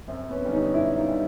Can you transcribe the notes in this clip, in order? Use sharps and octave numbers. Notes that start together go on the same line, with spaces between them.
F#2 C4
B3 C#4
D3 G3
C#4 D#4
F#2 D4 E4
D#4 F4
D3 G3